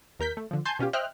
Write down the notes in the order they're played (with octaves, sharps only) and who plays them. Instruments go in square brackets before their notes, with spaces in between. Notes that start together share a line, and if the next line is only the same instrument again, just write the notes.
[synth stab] D#2 A#4 G6 B6
A3
D3 F3
G#5 A5 C6 G6
B2 C#4 F4 G4
C5 D#5 E5 G5 F6 F#6